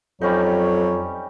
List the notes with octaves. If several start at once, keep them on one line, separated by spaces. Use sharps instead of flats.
F2 F#3 G3 C#4 D#4